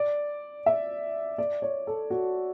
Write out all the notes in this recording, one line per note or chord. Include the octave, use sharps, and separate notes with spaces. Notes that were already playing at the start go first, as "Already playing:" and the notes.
Already playing: D5
E5
D5
C#5
A4
F#4